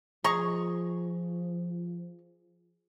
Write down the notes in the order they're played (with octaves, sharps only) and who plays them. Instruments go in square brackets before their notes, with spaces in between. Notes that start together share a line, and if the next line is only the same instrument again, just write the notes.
[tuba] F3 [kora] G#4 [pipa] D#5 A#5 C#6